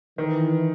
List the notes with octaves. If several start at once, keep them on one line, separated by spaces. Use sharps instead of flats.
D#3 E3